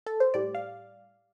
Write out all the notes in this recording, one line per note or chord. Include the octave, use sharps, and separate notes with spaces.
A4
C5
A2 G3 D5
F5